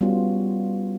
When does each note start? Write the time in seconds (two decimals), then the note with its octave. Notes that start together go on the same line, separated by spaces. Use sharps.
0.01 G3 B3 C#4 F4 F#4